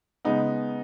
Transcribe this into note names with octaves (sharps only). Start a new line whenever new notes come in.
C#3 G#3 B3 D#4